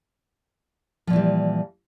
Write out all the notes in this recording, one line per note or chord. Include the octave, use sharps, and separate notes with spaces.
A#2 E3 F3 G3